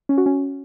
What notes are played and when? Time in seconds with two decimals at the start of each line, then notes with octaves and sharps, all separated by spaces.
0.09 C#4
0.18 F#4
0.26 C#4